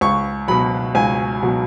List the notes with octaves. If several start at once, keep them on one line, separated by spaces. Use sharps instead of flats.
C#2 C#6
B2 F#3 B5
C#2 G#5
B2 F#3